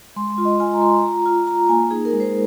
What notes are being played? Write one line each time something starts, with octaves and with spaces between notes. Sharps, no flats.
G#3 C6
C6
F4
D#5
F4 G#5
A#5
F4 C6
F4 A#5
F4
F4 A#5
A#3 G#5
D#4 G#4
A#4
G#3
C5